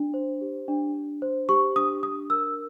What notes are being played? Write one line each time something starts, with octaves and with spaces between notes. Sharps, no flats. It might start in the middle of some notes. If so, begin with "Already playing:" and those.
Already playing: D4
C5
G4
D4
D4
C5
G4 C#6
D4 D#6
D4 D#6
A#4 E6